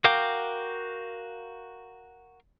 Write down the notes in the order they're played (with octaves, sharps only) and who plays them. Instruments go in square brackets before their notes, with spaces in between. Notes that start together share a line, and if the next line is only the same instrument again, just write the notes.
[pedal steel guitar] F#4 A#4 F5 G5 D6